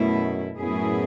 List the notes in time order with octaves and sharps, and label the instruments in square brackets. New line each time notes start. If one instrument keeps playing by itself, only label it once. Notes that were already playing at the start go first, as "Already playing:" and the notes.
Already playing: [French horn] F#2 [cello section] B2 A3 E4
[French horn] F#2 [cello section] A2 F#3 B3 E4 G#4